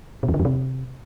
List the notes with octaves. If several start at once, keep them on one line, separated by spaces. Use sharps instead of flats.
B2
E2
D3
F2
C3